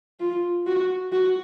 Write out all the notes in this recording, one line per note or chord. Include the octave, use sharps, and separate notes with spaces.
F4
F#4
F#4